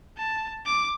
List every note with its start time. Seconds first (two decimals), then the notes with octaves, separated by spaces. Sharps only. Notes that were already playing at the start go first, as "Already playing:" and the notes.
0.17 A5
0.66 D6